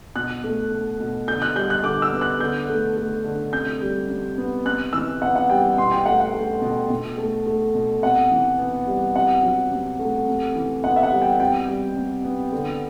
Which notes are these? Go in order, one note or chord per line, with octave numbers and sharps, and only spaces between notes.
B2 F#6
A3
A3
B2
D3 G6
F#6
G3 G6
F#6
D3 D6
E6
B3
F#6
D3 G6
A3
A3
D3
C3 G6
G3
C3
B3
C3 F#6
E3 E6
B3 F#5
F#5
G3 G5
B2 C6
G5
A3 F#5
F#5
A3
B2
B2
A3
A3
B2
C3 F#5
E3
B3
G3
C3 F#5
F#3
C3
A3
C3
E3
B3 F#5
E5
F#5
G3
G5
C3 G5
G3
C3
B3
D3